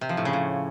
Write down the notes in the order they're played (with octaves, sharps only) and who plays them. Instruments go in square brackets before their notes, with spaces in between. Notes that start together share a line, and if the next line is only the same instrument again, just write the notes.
[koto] C3
F3
A2
C#3
A2